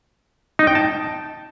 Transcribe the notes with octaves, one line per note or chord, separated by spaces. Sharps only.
D#4
G5
A5